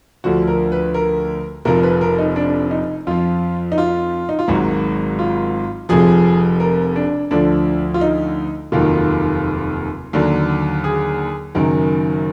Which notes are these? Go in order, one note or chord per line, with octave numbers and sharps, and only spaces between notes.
D2 D3 F3 F#4
A#4
B4
A#4
F1 F2 F3 A#4
B4
A#4
D#4
D4
D#4
F2 F3 F4
D#4
F4
D#4
F4
G#1 G#2 D#3 F#3 F#4
F4
F1 F2 F3 G#4
A#4
D4
D2 D3 F3 D4
F4
D#4
F1 D#2 D#3 F#3 F4
D#2 D3 F#3
G#4
F#1 F#2 D#3 F#3 A#4